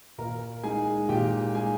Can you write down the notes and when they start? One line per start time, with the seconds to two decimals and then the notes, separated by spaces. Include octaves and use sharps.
0.18 A#2 A#4 A#5
0.63 G#3 D#4 G#4 G#5
1.09 A#2 G4 G5
1.55 G#3 D#4 G#4 G#5